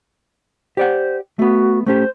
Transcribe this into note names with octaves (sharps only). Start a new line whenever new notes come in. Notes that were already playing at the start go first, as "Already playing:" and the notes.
G4 C5 D5 F#5
A3 B3 F#4
A3 C#4 G4 C5